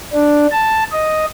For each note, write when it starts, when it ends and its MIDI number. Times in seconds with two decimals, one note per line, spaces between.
0.13 0.46 62
0.51 0.83 81
0.92 1.25 75